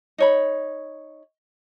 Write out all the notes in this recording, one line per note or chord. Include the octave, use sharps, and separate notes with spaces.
D#4 C#5 B5